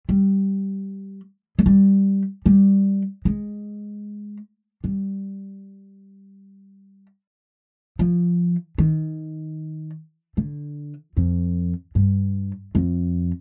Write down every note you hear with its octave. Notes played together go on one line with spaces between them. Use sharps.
G3
G#3
G3
G3
G#3
G3
F3
D#3
D3
F2
G2
F2